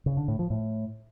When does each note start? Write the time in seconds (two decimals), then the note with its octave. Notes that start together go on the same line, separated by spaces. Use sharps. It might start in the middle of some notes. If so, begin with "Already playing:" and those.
0.06 C#3
0.17 D3
0.28 A2
0.39 F3
0.50 A2